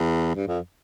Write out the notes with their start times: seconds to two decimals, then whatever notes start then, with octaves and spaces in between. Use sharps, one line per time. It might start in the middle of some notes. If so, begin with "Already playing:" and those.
Already playing: E2
0.35 G2
0.47 F2